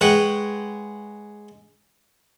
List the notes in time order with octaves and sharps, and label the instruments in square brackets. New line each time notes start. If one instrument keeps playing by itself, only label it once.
[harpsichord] G#3 B4 C#5 F#5 G5